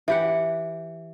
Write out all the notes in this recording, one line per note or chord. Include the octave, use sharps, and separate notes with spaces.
E3 G4 F#5